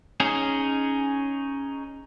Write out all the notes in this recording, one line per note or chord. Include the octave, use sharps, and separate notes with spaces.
C#4 D#4 G#4